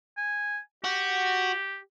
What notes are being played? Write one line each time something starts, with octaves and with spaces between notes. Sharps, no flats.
G#5
F#4 G4